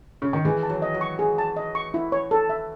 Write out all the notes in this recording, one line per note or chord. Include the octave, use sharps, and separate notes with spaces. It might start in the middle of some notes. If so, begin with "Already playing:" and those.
C#3
D#3
E3 G#4
A5
F#3
D#5
F#3
C#6
G#4
A5
D#5
C#6
E4
C#5
A4
E5